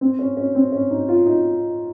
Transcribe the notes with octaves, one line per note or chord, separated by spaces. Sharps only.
C4
C#4
C#4
C4
C#4
D#4
F4
D#4